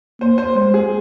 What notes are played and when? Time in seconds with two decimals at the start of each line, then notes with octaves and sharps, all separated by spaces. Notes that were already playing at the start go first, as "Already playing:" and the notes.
0.21 A#3 C5
0.38 C5
0.55 G#3 C5
0.74 G#4